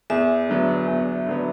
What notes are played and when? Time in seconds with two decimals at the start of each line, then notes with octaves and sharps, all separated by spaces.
0.10 E2 E5
0.48 D3 F#3 B3
0.87 E2
1.26 D3 F#3 B3